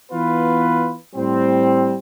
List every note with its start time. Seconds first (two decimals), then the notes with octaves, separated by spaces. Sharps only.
0.12 E3 B3 F4 B4
1.15 A2 G3 C4